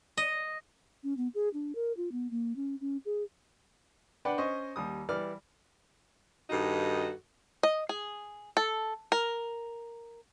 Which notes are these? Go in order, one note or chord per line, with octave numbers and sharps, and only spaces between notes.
D#5
C#4
B3
G#4
D4
A#4
F4
B3
A#3
C#4
C#4
G#4
D4 B4 D5 F#5 G5
C#4 C5 D#5 C#6
D#2 G3 D#6
E3 G3 D5 F6
G2 D#3 D#4 F#4 A4
D#5
G#4
A4
A#4